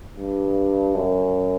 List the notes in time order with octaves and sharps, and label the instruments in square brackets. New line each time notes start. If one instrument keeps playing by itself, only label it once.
[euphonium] G2
F#2